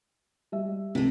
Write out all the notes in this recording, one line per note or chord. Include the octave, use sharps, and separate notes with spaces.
G3 E5
C#2 C3 A3